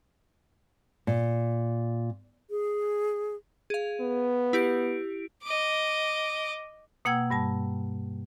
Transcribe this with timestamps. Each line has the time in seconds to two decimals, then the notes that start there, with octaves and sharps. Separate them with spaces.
1.07 A#2
2.50 G#4
3.70 G#4 F5
4.01 B3
4.53 E4 G4 D7
5.43 D#5 D6
7.05 B2 A#3 F#5 G5 E6 G#6
7.30 G2 G3 A5